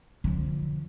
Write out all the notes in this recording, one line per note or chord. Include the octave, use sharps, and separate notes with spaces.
D3 F3